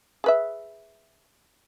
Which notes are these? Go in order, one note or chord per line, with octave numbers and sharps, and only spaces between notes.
G#4 B4 E5